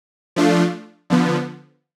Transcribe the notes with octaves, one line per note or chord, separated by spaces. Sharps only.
F3 A3 D4 F4
D3 F3 B3